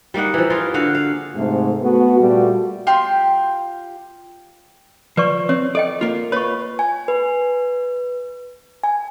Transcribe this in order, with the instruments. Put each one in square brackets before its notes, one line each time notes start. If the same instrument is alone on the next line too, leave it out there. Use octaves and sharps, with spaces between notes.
[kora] G3 A#3 D#4 F#5
E3 F3
G3 F4 G#4 A#4
D3 F#4 F5 F#5
F5
[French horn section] G#2 C3 A3
A3 B3 F#4
A#2 G3 A3 F#4
[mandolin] F4 G4 G5 C6
[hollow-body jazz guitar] F3 [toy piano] B4 D5 C#6
[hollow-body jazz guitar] C4 [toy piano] C#5
[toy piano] A4 D#5 G5 [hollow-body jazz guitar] D5
[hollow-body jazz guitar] A#3 F4
[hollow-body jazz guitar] F4 B4 [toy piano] C#5 C#6
[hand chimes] G#5
B4
G#5